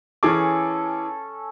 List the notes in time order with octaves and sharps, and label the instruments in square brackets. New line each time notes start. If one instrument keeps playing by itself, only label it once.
[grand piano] E3 G#4 D6 [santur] C#4 A4